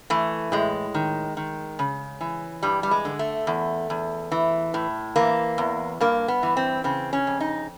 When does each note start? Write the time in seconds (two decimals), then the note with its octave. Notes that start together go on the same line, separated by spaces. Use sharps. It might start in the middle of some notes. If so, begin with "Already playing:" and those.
0.10 E3 A3
0.52 A2 G#3
0.94 D#3
1.37 D#3
1.79 C#3
2.21 E3
2.63 G2 G3
2.83 G3
2.91 G#3
3.05 D3
3.19 A3
3.47 E2
3.90 E2
4.32 E3
4.74 A2
5.16 E3 A#3
5.58 E2
6.00 G2 A#3
6.28 B3
6.43 E3
6.57 C4
6.84 C#3 C4
7.13 C#4
7.27 F2
7.40 D#4